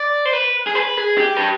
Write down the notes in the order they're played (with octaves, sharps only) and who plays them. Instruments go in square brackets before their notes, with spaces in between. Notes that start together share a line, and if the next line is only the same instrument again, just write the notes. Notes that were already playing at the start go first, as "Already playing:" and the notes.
Already playing: [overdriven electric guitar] D5
C5
B4
G#4
B4
G#4
G4
B4